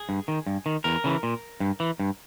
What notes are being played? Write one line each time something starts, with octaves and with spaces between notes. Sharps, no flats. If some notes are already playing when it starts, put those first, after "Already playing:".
Already playing: G#4
G2
D#3
G2
D#3
E2 A#4
C#3 E3
A#2
G2
E3
G2